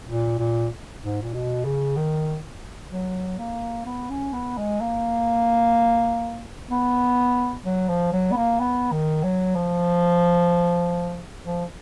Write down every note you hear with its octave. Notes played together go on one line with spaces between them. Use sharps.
A#2
A#2
G#2
A#2
B2
C#3
D#3
F#3
A#3
B3
C#4
B3
G#3
A#3
B3
F#3
F3
F#3
B3
A#3
B3
D#3
F#3
F3
F3